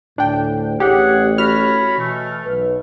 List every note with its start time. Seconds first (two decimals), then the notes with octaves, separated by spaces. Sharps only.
0.18 D2 A2 D4 G5
0.80 A1 G4 G#4 C#5 F#5
1.38 F#4 C#5 B5 F6
1.98 B2 E3 A3
2.45 B1 B4